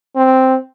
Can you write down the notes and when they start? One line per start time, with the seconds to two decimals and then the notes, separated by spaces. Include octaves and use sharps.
0.16 C4